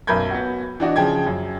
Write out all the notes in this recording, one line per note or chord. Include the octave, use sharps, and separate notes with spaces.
B1 F#2 A#4 B5 G6 G#6
B3 F#4
E3 D4 F#4 D#5
C#3 F3 G#4 G5 G#6
F#2